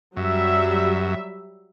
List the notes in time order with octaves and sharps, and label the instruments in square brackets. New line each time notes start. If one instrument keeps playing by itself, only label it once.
[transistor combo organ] F#2 [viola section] F#3 G3 E5